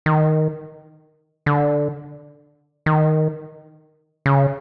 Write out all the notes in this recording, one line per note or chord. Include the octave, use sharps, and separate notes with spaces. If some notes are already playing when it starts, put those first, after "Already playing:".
D#3
D3
D#3
C#3